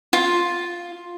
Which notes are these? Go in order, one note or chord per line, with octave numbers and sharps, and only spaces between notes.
F4